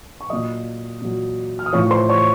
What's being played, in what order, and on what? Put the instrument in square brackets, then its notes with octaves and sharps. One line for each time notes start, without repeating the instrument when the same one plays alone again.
[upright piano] C#6
A#2 F#3 D#5 D#6
A#2 F#3
F6
D#6
A2 F3 C#5 C#6
C5 C6
C#5 C#6